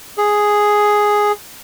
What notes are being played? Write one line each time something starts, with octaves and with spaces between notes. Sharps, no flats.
G#4